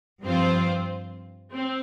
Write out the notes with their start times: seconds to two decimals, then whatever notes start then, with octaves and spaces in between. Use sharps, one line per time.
0.23 G2 F3 C4 F4 C5
1.52 C4